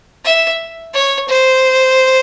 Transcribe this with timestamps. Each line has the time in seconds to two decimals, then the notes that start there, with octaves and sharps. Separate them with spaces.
0.24 E5
0.94 C#5
1.28 C5